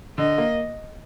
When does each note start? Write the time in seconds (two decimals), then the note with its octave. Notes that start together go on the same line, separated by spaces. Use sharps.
0.18 D3 D#5
0.38 A#3